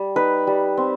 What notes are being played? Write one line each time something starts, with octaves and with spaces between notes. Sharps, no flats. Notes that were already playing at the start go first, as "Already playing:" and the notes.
Already playing: G3
D#4 B4
G3
C4